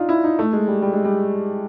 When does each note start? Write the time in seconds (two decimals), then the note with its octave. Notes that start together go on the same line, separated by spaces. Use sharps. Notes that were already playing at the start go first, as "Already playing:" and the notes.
Already playing: D4 D#4 F4
0.09 E4
0.24 D#4
0.39 A3
0.53 G#3
0.67 G3
0.82 G3
0.93 G#3
1.05 G3